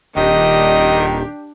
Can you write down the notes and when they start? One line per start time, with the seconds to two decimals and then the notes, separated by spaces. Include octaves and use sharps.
0.17 D#1 D#3 D4 G4 D#5